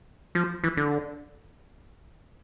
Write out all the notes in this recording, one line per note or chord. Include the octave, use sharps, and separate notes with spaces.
F3
E3
D3